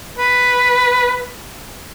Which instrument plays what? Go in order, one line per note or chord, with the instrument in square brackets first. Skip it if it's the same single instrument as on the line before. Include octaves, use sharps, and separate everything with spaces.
[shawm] B4